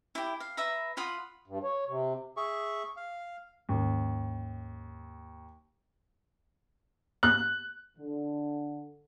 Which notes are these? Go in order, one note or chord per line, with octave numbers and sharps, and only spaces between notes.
E4 G4
F5
B4 E5 A#5 B5
F4 F#5 B5 D#6
G2
C#5
C3
G#4 E5 C#6
F5
D#2 G#2 C#4
F#6
D3